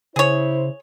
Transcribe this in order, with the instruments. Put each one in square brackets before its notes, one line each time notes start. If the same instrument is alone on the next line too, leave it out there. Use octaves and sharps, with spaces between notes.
[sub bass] C#3 [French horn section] E4 C5 [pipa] G#4 C#5